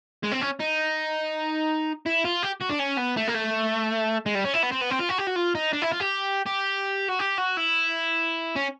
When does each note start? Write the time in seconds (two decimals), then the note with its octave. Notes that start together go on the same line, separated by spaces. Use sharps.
0.23 G#3
0.31 C4
0.41 C#4
0.60 D#4
2.06 E4
2.25 F4
2.43 G4
2.61 F#4
2.70 D4
2.80 C#4
2.98 B3
3.17 A3
3.28 A#3
3.35 A3
4.26 G#3
4.35 G3
4.44 C#4
4.54 E4
4.63 B3
4.72 C4
4.81 B3
4.91 C4
4.99 F4
5.09 F#4
5.18 G4
5.27 F#4
5.36 F4
5.55 D#4
5.73 D4
5.82 E4
5.92 F4
6.01 G4
6.46 G4
7.09 F#4
7.19 G4
7.38 F#4
7.57 E4
8.56 C#4